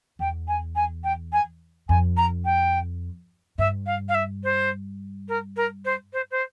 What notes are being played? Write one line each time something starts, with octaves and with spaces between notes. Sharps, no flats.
E2 G5
G#5
G#5
G5
G#5
F2 G#5
A#5
G5
G2 E5
F5
F5
E5
C5
A#4
A#4
C5
C5
C5